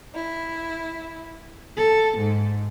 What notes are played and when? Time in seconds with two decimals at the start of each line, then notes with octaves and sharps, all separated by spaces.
0.15 E4
1.77 A4
2.18 G#2